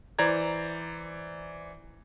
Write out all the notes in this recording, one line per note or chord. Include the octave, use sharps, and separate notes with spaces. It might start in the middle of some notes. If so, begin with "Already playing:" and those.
E3 C5 D5 A#5 G#6